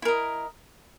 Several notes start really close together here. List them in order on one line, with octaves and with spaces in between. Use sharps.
E4 A#4 D#5